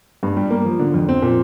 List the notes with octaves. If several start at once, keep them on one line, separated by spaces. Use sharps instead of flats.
G2
G3
A#3
F3
D3
F2
C4
A#2